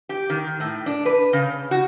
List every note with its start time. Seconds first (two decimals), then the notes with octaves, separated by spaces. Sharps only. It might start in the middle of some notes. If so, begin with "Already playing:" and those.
0.09 G4
0.30 D#3
0.60 A2
0.86 D4
1.05 B4
1.33 C#3
1.71 F#4